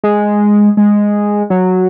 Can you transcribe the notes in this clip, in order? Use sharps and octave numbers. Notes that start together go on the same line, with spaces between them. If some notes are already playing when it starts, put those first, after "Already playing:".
G#3
G#3
F#3